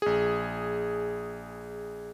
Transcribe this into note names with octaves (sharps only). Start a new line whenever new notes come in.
A#1 G#4